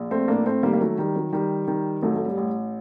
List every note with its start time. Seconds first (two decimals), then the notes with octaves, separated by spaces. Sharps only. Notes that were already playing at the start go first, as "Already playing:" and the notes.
Already playing: A#1
0.11 A3 C4
0.28 A2 A#3 D4
0.46 A3 C4
0.63 D#3 G3 A#3
0.73 A#3
0.81 F#3 A3
0.98 D#3 G3
1.16 F#3
1.33 D#3 G3
1.68 D#3
2.02 A1 F#3 A3
2.16 A3
2.26 G3
2.37 A1